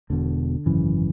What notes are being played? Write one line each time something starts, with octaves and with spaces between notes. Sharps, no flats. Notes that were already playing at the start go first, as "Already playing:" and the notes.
E1 E2 B2 D3
G#1 F#2 C#3 E3